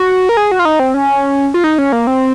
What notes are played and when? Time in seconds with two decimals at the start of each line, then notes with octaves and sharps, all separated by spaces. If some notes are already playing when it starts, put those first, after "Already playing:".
Already playing: F#4
0.29 A#4
0.37 G#4
0.52 F#4
0.59 F4
0.65 D#4
0.80 C4
0.94 C#4
1.54 F4
1.64 D#4
1.78 C#4
1.92 A#3
2.07 C4